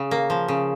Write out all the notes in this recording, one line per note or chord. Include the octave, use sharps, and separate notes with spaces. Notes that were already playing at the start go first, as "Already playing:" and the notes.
Already playing: C#3
A#3
F3
C#3